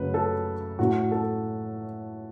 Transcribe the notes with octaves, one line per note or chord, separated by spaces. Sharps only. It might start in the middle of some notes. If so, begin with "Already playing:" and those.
Already playing: F#2 C#3 F#3 A3 B4
A4
A2 A3 F#4
A4